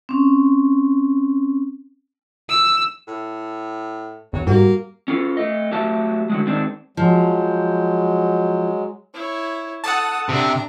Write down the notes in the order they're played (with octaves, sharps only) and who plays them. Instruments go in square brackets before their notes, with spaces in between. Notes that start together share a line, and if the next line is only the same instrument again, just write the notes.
[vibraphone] C4 C#4
[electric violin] E6
[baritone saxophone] A2
[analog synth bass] E2 [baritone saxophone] F#3
[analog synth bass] G#2 [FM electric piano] G3 F#4 [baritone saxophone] A#3
[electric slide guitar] C#4 F4 A4
A3 D#5
F#3 A3 G4 E5 A5
D3 F#3 G#3
D#3 G#3 C4 D4 D#4
[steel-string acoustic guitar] F3 [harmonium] F#3 G#3
[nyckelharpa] E4 C#5
[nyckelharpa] A4 D#6 [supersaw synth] F#5 A5
[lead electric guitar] C3 [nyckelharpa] D4 A#5